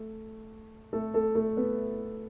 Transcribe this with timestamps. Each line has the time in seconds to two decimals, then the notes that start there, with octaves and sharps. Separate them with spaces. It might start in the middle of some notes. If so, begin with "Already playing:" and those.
Already playing: A3
0.93 A3 A4
1.14 A3 A4
1.35 A3 A4
1.57 B3 B4